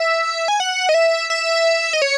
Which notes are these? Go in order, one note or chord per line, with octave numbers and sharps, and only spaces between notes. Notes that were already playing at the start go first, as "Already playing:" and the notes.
Already playing: E5
G#5
F#5
D#5
E5
E5
D#5
C#5